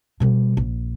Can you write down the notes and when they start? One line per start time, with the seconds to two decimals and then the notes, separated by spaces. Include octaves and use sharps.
0.20 B2 G3
0.57 A#1